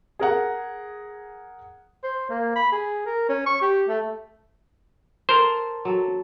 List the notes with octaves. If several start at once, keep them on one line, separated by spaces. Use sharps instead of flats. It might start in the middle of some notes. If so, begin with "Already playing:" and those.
G#4 A#4 F#5
C5
A#3
B5
G#4
A#4
C#4
C#6
G4
A3
A4 A#4 C5
F#3 A4